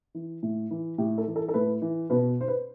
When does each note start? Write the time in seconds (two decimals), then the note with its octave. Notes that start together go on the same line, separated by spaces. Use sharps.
0.14 E3
0.43 A2
0.71 E3
0.98 A2 G4
1.18 A4
1.27 E3
1.36 A4
1.49 A4
1.54 A2 B4
1.82 E3
2.10 B2 B4
2.41 C5
2.48 B4